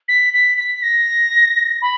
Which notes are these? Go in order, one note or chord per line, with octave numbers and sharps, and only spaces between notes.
B6
B6
B6
A#6
B5